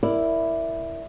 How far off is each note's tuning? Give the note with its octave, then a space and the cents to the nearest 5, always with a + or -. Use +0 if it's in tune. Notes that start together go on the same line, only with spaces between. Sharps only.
E4 +0 A#4 +0 D5 +0